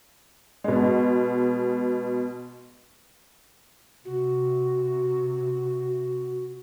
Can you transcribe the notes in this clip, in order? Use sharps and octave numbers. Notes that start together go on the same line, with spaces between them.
B2 G#3
C3 F#4